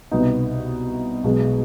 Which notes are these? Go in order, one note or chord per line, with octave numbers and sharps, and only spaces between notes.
C2 B2 B3 D#4
B1 B2 G#3 B3